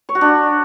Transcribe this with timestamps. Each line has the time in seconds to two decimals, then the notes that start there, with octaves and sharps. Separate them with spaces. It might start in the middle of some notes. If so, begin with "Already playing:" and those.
0.09 C#5
0.15 F#4
0.21 D4